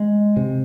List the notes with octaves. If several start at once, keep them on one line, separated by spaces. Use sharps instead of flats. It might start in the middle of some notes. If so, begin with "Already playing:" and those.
Already playing: G#3
C3